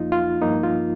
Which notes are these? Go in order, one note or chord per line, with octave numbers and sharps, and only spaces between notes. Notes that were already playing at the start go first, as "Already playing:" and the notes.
Already playing: F2 F3 A#3 D#4 F4
F4
G2 F3 A#3 D#4
F4